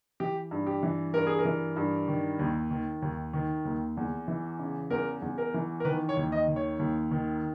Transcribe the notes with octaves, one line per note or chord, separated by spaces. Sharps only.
E3 G4
G2
G4
E3
G2 A#4
G#4
A#4
E3
G2
D#3
D#2
D#3
D#2
D#3
D#2
E2
E3
C#3
E2 A#4
E2
A#4
E3
A#4
D#3 B4
C#5
D#2
D#5
D#3
C#5
D#2
D#3